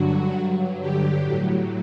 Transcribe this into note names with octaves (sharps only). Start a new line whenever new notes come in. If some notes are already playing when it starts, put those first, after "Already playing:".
Already playing: G2 D3 F#3 F#4
G2 F#3
G2 D3 F#3 G4
A2 F#3